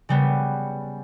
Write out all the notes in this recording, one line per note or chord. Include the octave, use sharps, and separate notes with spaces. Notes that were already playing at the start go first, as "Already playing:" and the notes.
C#3 G3 B3